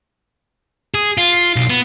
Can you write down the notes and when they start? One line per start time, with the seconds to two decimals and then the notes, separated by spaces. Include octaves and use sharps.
0.94 G#4
1.17 F4
1.56 B1
1.70 B3